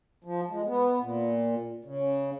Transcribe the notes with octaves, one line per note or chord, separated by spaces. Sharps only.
F3
G#3
B3
A#2
C#3